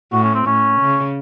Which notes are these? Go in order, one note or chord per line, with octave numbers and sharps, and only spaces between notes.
A2 F#4
C#4
C4
A2 C#4
C#3